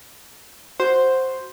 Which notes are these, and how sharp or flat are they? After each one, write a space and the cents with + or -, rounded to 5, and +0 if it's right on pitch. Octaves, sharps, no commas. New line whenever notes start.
F#4 +0 C5 +0